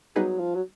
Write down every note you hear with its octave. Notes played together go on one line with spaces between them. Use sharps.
F#3 G3 B3 D#4 G#4 B4
F3
F#3